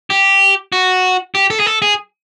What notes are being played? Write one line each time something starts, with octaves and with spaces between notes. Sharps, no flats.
G4
F#4
G4
A4
G#4
A4
G#4